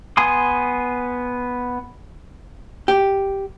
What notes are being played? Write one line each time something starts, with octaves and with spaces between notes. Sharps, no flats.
B3 G#5 C6 D#6
G4